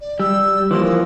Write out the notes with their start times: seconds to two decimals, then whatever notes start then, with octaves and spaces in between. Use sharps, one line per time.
0.01 D5
0.20 G3 E6
0.71 E3 F3 A#3 C6
0.85 B4